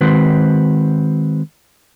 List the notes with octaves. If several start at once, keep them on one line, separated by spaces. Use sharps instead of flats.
D#3 G#3 C4 F#4 B4 C5